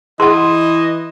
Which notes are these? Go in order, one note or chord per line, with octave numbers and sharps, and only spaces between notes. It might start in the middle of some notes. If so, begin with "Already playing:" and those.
E3 G#4 D#5 F#5 C6